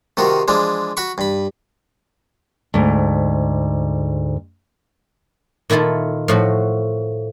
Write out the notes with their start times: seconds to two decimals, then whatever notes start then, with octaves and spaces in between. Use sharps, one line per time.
0.17 C3 D#3 F4 F#4
0.48 E3 F3 G#3 D4
0.97 F#4 F#5 B5 C#6
1.18 G2 B5
2.74 D2 G#2
5.70 A#2 D#3 E4 F4 A4
6.28 A2 F3 F#4